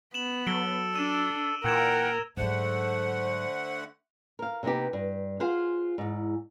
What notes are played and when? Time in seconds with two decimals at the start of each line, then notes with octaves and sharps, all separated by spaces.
0.14 B3 E7 F#7
0.47 F#3 A4 D7 G7
0.96 D4 E6 D#7 E7
1.64 A#2 E3 A#4 F#5 G5 E6 G#6 E7
2.37 G#2 D3 F#3 A3 C5 F#5
4.39 A#4 F5
4.63 C3 A#3 B3 D#4 G4
4.93 G2
5.40 F4 G#4 C5 F5 F#5
5.98 E2 G#2